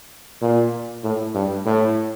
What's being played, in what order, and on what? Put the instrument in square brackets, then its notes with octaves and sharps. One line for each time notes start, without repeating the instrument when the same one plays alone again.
[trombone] A#2
A2
G2
A2